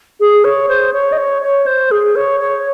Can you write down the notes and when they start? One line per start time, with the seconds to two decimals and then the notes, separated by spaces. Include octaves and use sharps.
0.20 G#4
0.44 C#5
0.69 C5
0.93 C#5
1.12 D#5
1.18 C#5
1.42 C#5
1.66 C5
1.91 G#4
2.16 C#5
2.40 C#5